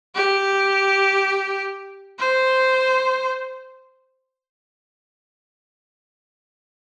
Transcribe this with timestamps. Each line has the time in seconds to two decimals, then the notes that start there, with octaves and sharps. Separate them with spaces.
0.15 G4
2.19 C5